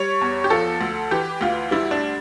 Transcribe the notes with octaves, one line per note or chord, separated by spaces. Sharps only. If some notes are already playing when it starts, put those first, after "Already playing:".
Already playing: G3 C#5
E2
G4
F3 A4
D2
E3 G4
D2 F4
G3 E4
D4